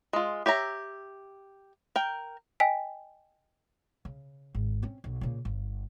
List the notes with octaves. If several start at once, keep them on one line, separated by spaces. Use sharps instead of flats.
G#3 F4
G4 C#5 E5 A#5
A#4 G5
D#5 G5 G#5 B6
C#3
G#1
C4 C#4
B1
A#2 C#3
G1